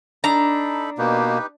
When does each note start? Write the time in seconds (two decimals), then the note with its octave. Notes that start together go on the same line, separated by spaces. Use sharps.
0.24 D4 D#4 A4 A#5 B5
0.98 B2 A#3 D#4 G4 B4